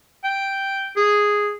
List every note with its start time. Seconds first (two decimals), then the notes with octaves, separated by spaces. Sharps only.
0.24 G5
0.96 G#4